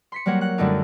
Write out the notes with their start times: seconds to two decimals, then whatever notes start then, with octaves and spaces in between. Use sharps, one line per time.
0.12 C6 B6 C#7
0.26 F#3 G3 A#3 C#5 F#5
0.41 F#5 F#6
0.58 F#2 D3 G3 A3 D4 D#4